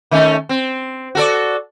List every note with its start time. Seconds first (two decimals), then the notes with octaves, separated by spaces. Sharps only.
0.11 D#3 A3 C#4
0.49 C4
1.15 F#4 A4 D5